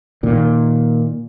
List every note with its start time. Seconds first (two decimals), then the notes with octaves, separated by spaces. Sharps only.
0.23 A#2 D#3